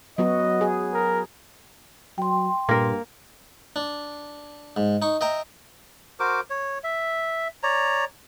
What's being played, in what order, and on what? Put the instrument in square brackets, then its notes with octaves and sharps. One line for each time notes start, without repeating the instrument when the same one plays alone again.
[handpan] F#3 B3 F#4 [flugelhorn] D#5
[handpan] G#4
[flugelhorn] A#4
[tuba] F#3 [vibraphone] G5 C6
[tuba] G2 [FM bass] A#2 [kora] A#3 A#4
[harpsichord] D4
G#2
D#4 C#6
D#5 E5 G5 A#5
[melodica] F#4 A#4 C5 D6
C#5
E5
C#5 D5 A#5